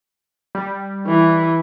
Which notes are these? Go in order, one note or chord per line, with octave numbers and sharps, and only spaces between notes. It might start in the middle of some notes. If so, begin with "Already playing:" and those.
G3
E3